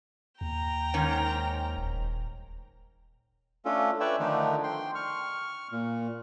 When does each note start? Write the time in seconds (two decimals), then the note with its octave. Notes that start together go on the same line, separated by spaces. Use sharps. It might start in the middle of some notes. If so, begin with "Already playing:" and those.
0.41 D#2 G5 A#5
0.94 G#2 D#3 C#4
1.77 D#1
3.65 A3 C#4 D4 F4 A4
4.00 B4 C#5 D5 E5 G5
4.19 D3 D#3 F3 A3 D4 D#4
4.64 G5 C6
4.95 C#6 F6
5.72 A#2